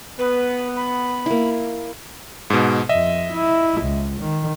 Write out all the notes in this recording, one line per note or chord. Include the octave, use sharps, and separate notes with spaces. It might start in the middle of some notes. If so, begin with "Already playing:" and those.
B3 B4
B5
A#3 E4
G#2 B2
F2 D#5 E5
E4
C#2
D#3